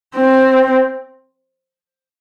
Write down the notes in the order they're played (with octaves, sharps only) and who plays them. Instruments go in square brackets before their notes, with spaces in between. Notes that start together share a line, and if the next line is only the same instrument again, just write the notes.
[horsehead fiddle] C4